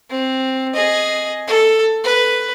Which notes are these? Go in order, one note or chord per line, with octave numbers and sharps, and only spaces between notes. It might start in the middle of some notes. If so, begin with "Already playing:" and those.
C4
G#4 D#5
A4
B4